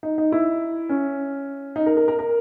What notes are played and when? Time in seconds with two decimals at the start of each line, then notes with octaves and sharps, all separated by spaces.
0.03 D#4
0.18 D#4
0.32 E4
0.89 C#4
1.76 D#4
1.86 A#4
1.97 A#4
2.08 A#4
2.19 A#4